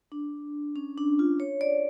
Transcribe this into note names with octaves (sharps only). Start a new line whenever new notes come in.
D4
C#4
D4
F4
C#5
D5